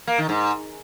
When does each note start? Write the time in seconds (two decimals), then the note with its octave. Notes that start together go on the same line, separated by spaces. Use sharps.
0.07 A#3
0.18 D#3
0.29 G#2